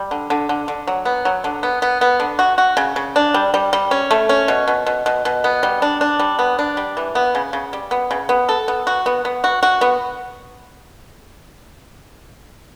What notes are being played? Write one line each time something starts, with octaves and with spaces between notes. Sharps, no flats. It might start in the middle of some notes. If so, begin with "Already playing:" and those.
Already playing: G3
D3
D3
D3
D3
F#3
B3
F#3
D3
B3
B3
B3
D3
F#4
F#4
C#3
C#3
D4
G3
G3
G3
C#4
A3
C#4
B2
B2
B2
B2
B2
B3
G3
D4
D4
G3
B3
D4
G3
E3
B3
C#3
C#3
G3
B3
C#3
B3
A4
B3
F#4
B3
B3
F#4
F#4
B3